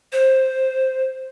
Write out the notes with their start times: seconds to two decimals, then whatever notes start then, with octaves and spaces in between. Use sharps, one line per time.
0.12 C5